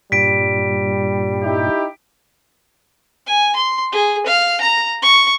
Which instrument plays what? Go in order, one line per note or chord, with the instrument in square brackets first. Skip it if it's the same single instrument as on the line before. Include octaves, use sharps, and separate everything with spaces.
[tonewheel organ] G2 A#2 [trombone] G3 [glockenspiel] B6 D7
[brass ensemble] D#4 E4 G4
[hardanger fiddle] G#5
C6
G#4
F5
A#5
C#6